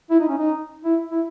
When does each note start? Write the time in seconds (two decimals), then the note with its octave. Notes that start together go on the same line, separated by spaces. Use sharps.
0.11 E4
0.20 D#4
0.29 C#4
0.38 D#4
0.85 E4
1.12 E4